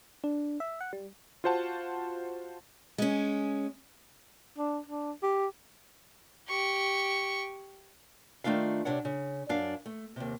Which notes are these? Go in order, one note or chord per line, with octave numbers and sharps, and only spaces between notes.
D4
E5
F#5
G3
F4 F#4 C5 F#5 A5
G#3 C#4
D4
D4
G4
G4 C#6
D#3 F3 A3 D4 F4 F5
C3 D4 C#5 F#5
C#3
F#2 D4 F5
A3
D#2 C3